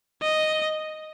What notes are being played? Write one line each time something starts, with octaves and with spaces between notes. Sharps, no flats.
D#5